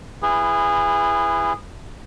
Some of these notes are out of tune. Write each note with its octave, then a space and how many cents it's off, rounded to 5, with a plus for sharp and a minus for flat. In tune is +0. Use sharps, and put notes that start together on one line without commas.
E4 +15 G#4 -20 B4 +5